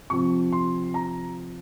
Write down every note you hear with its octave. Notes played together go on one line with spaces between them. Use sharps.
C3 F3 C4 C#6
C6
A#5